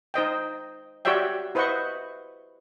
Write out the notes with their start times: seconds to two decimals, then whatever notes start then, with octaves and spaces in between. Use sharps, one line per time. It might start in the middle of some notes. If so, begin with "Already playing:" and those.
0.14 D#4 C5 D#5 G5
1.05 F#4 G4 C#5 D5 E5 G5
1.55 E4 B4 C5 D#5 F#5 C#6